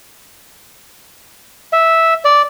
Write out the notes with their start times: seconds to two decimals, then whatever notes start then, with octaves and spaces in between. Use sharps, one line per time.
1.73 E5
2.25 D5